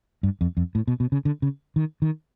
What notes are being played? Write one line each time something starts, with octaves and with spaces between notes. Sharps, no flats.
G2
F2
F2
A2
B2
B2
C#3
D3
C#3
D#3
D#3